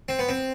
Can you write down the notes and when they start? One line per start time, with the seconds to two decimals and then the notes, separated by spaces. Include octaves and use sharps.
0.09 C4
0.19 B3
0.29 C4